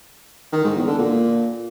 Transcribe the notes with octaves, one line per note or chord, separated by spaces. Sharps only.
D#3
G#2
E2
D3
A#2